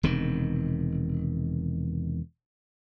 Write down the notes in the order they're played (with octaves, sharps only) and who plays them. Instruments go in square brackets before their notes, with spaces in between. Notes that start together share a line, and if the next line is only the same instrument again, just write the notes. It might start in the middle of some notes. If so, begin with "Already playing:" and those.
[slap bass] E1 C3 D#3